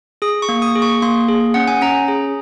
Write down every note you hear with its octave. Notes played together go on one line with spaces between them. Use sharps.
G#4 D#6
C#6
A#3
D#6
G#4
C#6
A#3 C6
G#4
C#4 F#5
G#5
C#4 A#5
G#4